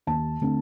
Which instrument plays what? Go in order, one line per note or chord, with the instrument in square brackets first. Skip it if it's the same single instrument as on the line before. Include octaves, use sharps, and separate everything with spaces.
[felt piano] D#2 A5
D3 A3 C4